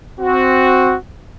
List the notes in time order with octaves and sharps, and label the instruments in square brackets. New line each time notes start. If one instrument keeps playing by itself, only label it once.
[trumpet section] C4 F#4